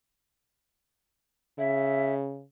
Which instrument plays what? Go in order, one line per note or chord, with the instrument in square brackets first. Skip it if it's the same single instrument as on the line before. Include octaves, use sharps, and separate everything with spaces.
[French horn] C#3 [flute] E5